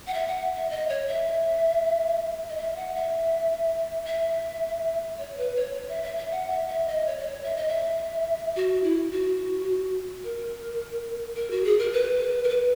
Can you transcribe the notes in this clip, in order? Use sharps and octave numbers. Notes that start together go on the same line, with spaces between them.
F#5
E5
F#5
E5
D#5
C#5
E5
D#5
E5
F#5
E5
E5
C#5
B4
C#5
C#5
E5
E5
E5
F#5
E5
E5
D#5
C#5
D#5
C#5
E5
D#5
E5
F#4
E4
F#4
A#4
A#4
F#4
G#4
A#4
B4
A#4
B4